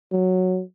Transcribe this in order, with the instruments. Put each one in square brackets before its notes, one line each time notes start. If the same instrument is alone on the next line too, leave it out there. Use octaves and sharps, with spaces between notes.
[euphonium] F#3